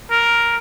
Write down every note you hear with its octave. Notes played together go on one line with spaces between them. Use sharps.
A#4